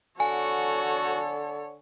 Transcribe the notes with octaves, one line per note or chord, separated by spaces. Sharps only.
D3 F#4 A4 C#5 G#5